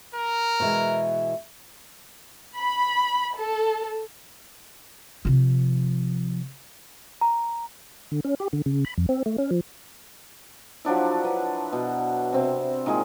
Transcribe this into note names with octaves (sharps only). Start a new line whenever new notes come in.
A#4
B2 E3 G#3
B5
A4
C3 F3
A#5
D3
C#4
G4
D3
C#3
B5
F2
C4
A3
C#4
F3
F3 F#3 D4 E4
B4
B2
C3 C4
A#2 D#3 G#3 G#4